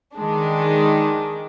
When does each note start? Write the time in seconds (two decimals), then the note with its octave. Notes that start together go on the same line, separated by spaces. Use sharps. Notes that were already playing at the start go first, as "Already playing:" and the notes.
0.14 D#3 G#3 D4